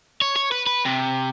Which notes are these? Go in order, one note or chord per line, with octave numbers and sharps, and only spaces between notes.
C#5
C#5
B4
B4
C3